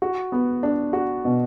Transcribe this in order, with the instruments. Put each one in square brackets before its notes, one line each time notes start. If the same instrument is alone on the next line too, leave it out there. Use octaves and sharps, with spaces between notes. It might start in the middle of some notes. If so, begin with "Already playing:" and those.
[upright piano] F#4
B3
D4
F#4
B2